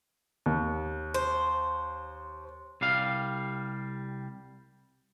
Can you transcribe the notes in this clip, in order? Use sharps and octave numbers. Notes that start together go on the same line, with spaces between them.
D#2
C5
C2 G3 F5